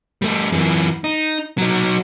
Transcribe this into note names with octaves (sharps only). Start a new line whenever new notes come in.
G3 A3
F#2 E3
D#4
F#3 D#4